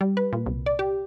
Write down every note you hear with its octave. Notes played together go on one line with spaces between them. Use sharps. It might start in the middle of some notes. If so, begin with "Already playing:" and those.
G3
B4
A#2
C2
D5
G4